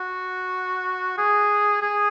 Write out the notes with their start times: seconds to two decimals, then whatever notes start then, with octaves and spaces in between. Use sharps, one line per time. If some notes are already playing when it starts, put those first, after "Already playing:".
Already playing: F#4
1.18 G#4
1.82 G#4